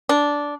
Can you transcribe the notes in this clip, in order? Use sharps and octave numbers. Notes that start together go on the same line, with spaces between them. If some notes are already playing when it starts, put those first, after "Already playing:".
D4